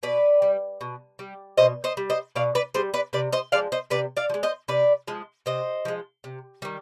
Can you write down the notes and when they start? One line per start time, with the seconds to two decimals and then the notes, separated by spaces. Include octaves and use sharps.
0.03 B2 B4 D5
0.42 G3
0.81 B2
1.19 G3
1.57 B2 C5 D#5
1.84 C5 D#5
1.97 G3
2.10 C5 D#5
2.35 B2 D5 F5
2.55 B4 D5
2.74 G3 G#4 C5
2.94 B4 D5
3.13 C3 B4 D5
3.33 C5 D#5
3.52 F3 G#3 D5 F5
3.72 C5 D#5
3.90 C3 B4 D5
4.17 D5 F5
4.30 F3
4.34 G#3
4.43 C5 D#5
4.68 C3 B4 D5
5.08 F3 G#3
5.46 C3 C5 D#5
5.85 F3 G#3
6.24 C3
6.62 D#3 G3